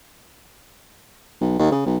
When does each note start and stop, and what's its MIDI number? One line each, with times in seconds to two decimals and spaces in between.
1.41 1.55 35
1.59 1.69 39
1.72 1.83 49
1.86 1.97 35